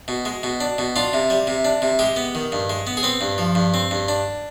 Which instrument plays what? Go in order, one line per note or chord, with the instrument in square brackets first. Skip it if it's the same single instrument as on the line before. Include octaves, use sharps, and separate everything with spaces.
[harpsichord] B2
G#3
B2
D4
B2
D4 F4
C3
G3
C3
D4
C3
G#3 G4
B3
D#3
G2
G#3
B3
G#4
C4 B4
G2
F3
G2
C4
G2
D4